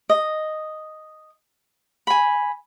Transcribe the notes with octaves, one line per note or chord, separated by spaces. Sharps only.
D#5
G#5 B5